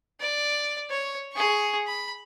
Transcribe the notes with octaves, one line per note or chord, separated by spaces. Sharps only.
D5
C#5
G#4 C#6
B5